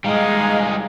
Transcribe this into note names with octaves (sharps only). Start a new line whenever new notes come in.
G3 G#3 D#4 F5